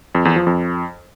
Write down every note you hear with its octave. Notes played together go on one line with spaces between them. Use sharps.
F2
E2
F3
F2